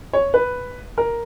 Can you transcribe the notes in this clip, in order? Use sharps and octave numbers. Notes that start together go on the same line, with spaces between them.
C#5
B4
A#4